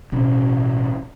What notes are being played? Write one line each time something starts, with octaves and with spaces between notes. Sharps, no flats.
A1 B2 C#4